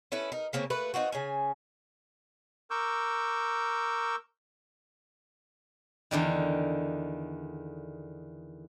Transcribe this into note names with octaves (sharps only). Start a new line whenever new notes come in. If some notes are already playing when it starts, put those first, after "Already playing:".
C#4 E4 A4 B4
D#4 A#4
C#3 A#3 C4 C#4
A3 A#3 B4
C4 D#4 F4 F#4
C#3 C#4 G#5
A#4 C#6 D6 E6 G6
E2 D3 D#3